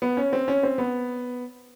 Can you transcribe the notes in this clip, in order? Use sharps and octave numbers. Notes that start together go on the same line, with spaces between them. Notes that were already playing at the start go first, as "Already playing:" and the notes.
B3
C#4
C4
C#4
C4
B3